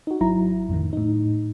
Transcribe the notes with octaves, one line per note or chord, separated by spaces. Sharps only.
D#4 F#4
G#1 F#3 E4 A#5
F2 A2 D3 D#3
A2 D#4